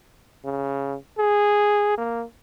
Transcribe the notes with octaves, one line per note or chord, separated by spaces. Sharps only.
C#3
G#4
A#3